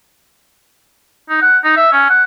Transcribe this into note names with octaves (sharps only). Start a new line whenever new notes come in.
D#4
F#5
D#4
E5
C#4
F#5